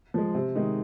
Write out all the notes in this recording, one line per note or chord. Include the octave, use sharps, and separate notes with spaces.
F3 G#3
C3
D#3 G#3 D#4